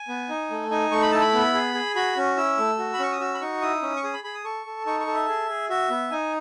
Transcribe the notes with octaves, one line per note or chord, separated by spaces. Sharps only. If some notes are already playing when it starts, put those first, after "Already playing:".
Already playing: G#5
B3
D#4
A3
D#4 G#5
A3 C#6
B5
E4 A5
B5
B3
G#4
G#4
F#4 B5
C#4
E4 E6
A3
F#4
B5
C#4 C#6
D#6
F#4 E6
B5
D#4 C#6
E4 D#6
C#4
C#6
G#4 D#6
B5
G#4 B5
D#6
A4 C#6
A4
D#4 C#6
C#6
A4
E5
G#4
G#4
F#4 E5
B3
D#4 G#5